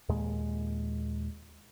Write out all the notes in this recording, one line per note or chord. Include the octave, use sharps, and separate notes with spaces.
D#2 A#2 G#3